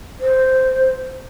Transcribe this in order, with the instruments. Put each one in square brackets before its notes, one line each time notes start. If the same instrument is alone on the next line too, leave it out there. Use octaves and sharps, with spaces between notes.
[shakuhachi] C5